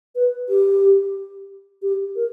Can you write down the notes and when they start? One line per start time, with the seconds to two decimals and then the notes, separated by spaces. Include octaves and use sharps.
0.16 B4
0.49 G4
1.82 G4
2.16 A#4